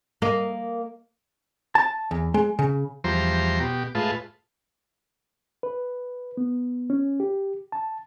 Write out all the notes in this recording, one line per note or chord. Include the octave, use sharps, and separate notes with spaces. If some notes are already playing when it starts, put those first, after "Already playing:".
A#3 D#5
A5
E2
G#3
C#3
E2 F3 G3 C5 A#5 C6
B2 G4
A2 G#3 F4 B4 A5
B4
B3
C#4
G4
A5